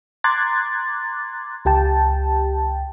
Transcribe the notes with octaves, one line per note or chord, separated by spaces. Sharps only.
A#5 C6 D6 F#6 G#6 A6
C#2 G4 G5 A5